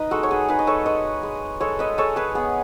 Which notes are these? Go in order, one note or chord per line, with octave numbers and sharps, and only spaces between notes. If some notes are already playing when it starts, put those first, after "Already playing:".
Already playing: D#4 B4 D#5
G#3 F#4 A4
C#5
G#4 B4
D#4 G#4 B4
D#5
A4 C#5
G#3 B4 D#5
G#3
G#3 A4 C#5
B4 D#5
G#3 A4 C#5
G#4 B4
B3 G#4